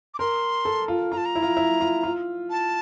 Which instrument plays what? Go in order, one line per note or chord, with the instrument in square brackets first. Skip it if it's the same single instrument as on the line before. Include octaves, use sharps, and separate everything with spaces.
[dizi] D6
[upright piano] A#4 [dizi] C6
[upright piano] A4
F4
[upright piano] F4 [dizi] A#5
[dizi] A5
A#5
[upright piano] E4
F4
E4
F4
F4
[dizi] A5